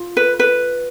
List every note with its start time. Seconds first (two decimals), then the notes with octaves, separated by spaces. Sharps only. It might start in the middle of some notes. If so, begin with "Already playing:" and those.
Already playing: F4
0.17 B4
0.39 B4